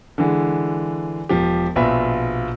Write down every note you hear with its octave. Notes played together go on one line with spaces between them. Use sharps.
D3 E3 G#3
E1 F3 G4
A#1 B2 F4 B4 E5 B5